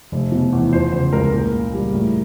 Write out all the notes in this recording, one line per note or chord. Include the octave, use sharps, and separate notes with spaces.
F1
B2
E2
F3 C5
C#3 C5
C#2 A#4
A#2 A#4
A#2
G3
A2